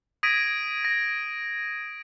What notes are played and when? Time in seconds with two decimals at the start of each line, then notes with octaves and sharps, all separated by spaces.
0.23 D#6 G#6 A#6 B6 D7 D#7
0.85 A#6